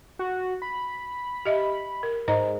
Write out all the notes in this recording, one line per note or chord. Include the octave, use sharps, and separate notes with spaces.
F#4
B5
G4 D#5 E5
A#4
G#2 C5 D#5 A#5